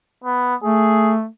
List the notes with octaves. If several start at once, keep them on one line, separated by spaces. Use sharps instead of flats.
B3
A3 G#4